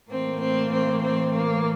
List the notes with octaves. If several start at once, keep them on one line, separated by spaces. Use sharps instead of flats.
A2 E3 A#3 C4
C4
C4
C4
A#3